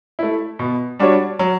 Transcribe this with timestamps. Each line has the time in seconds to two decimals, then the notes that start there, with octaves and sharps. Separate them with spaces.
0.19 A3 E4
0.59 B2
0.99 G3 D4 F#4 C#5
1.39 F#3